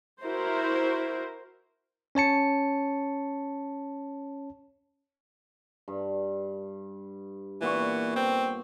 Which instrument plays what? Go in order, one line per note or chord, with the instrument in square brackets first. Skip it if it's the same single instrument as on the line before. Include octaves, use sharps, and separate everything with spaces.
[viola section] E4 F#4 A#4 C5
[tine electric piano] C#4 C#5 A5 C#7
[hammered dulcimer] G2
[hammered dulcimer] A#2 B3 C#6 [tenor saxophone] E3
[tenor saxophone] C4